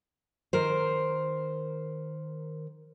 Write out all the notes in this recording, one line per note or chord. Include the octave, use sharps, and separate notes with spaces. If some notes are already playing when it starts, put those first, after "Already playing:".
D#3 A#4 C5